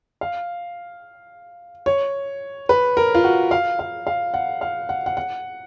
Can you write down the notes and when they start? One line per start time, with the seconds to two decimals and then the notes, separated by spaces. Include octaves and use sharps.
0.21 F5
1.86 C#5
2.69 B4
2.97 A#4
3.15 F4
3.24 F#4
3.51 F5
3.79 F5
4.07 F5
4.34 F#5
4.61 F5
4.89 F#5
5.06 F#5
5.17 F#5